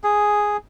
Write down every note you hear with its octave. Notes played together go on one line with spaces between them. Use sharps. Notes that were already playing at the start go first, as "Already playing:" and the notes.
G#4